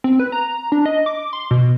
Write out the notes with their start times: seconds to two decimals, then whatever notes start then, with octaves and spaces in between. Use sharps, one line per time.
0.04 C4
0.19 B4
0.32 A#5
0.72 D4
0.85 D#5
1.06 D6
1.33 C6
1.51 B2